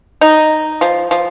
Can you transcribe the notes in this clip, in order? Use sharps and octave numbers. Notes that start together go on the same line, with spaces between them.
D#4
F3
F3